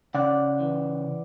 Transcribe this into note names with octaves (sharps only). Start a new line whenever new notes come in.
C#3 D5 F#5
E3